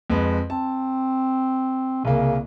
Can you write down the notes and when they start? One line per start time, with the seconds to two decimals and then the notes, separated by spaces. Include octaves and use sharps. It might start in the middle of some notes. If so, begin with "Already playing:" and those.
0.10 F2 G#3 B4
0.50 C4 A5
2.05 C2 C#3 A#3